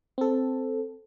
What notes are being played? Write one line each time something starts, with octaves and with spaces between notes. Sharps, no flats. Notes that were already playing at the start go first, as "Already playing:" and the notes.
C4 A4